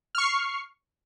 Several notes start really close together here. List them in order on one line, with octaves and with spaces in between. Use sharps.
F6 C#6 C7